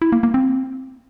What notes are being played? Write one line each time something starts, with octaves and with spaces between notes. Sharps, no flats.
E4
A#3
A#3
C4